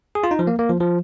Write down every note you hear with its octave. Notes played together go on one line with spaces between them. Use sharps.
G#4
F4
D#4
F3
A#3
A#3
F3
F3